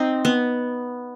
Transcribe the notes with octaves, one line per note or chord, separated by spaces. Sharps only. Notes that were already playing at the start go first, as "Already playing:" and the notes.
Already playing: C4 D#4
B3